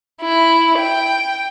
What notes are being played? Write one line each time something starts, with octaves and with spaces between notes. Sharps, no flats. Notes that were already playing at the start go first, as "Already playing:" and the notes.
E4
G5